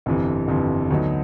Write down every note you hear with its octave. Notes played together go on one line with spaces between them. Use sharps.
G1 F2 C3 E3
G1 F2 C3 E3
D2 D3 F#3 B3 D#4